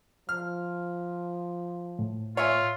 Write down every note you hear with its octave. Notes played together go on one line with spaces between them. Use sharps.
F3 F6
A2
F4 C#5 E5 G#5